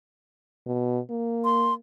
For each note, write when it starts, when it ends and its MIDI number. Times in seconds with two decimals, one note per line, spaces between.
0.66 0.99 47
1.10 1.77 58
1.45 1.74 84